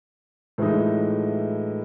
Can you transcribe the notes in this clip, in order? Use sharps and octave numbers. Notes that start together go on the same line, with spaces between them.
A2 E3 F3 G#3 D#4